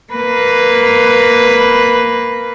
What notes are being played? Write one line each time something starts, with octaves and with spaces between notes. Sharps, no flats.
A#3 B4